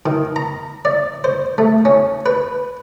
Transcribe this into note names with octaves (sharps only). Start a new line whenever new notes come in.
D#3
A#5
D5
C5
A3
C#4
B4